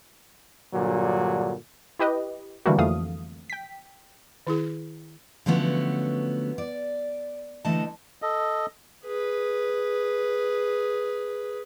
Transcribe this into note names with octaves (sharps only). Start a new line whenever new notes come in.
G2 A#2 D3 F#3
E4 G4 B4 D#5
D3 E3 G3 A3 A#3 F#4
F2 E3 A3 F5 D#6
G5 B6
D#3 E4 G#4
D3 F3 F#3 A3 B3 C#4
D5
D3 E3 A3 D#4 D#5 A5
A4 D#5
G#4 B4